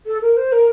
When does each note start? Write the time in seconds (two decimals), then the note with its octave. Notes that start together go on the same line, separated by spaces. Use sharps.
0.06 A4
0.21 A#4
0.36 C5
0.52 A#4